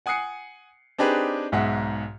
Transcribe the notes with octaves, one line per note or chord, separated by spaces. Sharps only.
F#5 G#5 D#6 F#6 C7 C#7
C4 D4 D#4 G4 G#4 B4
B1 G#2 G#3 E5 F#5